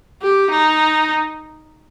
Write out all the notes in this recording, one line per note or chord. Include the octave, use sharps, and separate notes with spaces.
G4
D#4